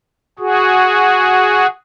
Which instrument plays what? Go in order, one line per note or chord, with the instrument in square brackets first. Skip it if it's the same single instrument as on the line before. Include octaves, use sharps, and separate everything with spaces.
[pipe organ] F#4 G#4